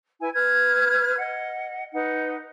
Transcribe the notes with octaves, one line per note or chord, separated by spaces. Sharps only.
E4 B4 G#5
B4 F6 G#6
D#5 F#5
D#4 B4 F#5